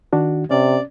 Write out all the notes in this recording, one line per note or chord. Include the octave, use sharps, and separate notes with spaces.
D#3 D4 F#4
C3 C#4 D5